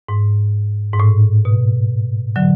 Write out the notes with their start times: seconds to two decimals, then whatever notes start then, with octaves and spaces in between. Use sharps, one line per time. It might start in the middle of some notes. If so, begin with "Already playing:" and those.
0.09 G#2
0.94 G#2
1.00 A2
1.45 B2
2.36 D3 F#3